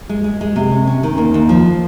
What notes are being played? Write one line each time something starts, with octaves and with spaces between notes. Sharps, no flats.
G#3
G#3
G#3
C3
C#4
C#4
D#3
D#2
D#2
F3